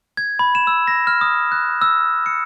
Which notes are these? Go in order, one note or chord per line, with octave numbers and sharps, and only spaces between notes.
G#6
B5
E7
E6
A#6
F6
D#6
F#6
E6
C#7